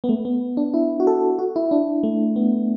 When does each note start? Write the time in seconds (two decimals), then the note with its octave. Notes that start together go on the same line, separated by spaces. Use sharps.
0.04 B3
0.09 A3
0.25 B3
0.57 D4
0.74 E4
1.00 F#4
1.07 A4
1.39 F#4
1.56 E4
1.71 D4
2.03 A3
2.36 B3